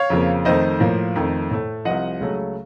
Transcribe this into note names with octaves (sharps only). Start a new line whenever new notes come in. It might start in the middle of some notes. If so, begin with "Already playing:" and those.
Already playing: C#5 F5
F2 C#3 F3 A#3
F2 D#3 A3 C5 D#5
A2 F3 A#3
F2 D#3 A3
A2 A3
C2 C3 F3 D#5 F#5
C#2 C#3 F#3 A3